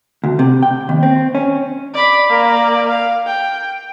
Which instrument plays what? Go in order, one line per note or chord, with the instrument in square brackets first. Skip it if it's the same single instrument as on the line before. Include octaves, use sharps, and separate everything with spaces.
[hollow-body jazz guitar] D2
C3
G5
D#2
C4
C#4
[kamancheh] D5 B5
A#3 D5
F5
G5